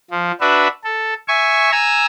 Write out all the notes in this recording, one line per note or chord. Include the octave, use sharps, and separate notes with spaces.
F3
D4 F#4 B4 E5
A4
E5 G#5 C#6
G#5 A#5 E6